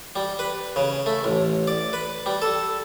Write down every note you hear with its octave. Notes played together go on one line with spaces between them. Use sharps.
G3
B4
C#3
A3
A1
D5
B4
G3
A4